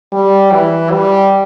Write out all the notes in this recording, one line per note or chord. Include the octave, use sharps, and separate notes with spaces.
G3
E3
G3